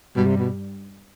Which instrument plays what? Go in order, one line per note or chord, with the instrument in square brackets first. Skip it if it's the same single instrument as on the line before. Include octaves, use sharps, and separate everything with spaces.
[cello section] G2 G3 [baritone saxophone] B2
[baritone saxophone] C3
B2